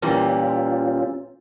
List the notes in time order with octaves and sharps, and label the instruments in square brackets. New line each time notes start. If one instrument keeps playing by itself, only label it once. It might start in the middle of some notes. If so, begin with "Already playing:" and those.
[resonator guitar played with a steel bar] A#2 E3 G3 [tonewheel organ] C#4 F4